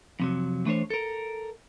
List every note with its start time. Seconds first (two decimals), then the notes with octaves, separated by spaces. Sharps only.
0.20 F2 C3 F#3
0.65 E3 A3 D4 C5 C#5
0.90 A4 A#4